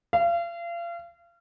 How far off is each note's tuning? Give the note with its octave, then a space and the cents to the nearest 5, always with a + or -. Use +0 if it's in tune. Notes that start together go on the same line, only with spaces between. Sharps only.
F5 -35